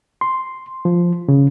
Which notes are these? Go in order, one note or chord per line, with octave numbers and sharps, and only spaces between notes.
C6
F3
C#3